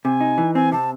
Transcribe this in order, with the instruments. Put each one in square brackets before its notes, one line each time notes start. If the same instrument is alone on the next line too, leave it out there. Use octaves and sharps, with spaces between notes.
[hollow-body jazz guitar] C3 [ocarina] G#5
[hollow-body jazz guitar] D#4
E3
[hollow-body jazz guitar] C4 [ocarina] G#5
[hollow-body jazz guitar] C3 [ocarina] A5